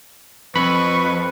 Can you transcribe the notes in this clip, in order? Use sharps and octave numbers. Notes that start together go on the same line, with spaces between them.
F2 B4 B5 C#6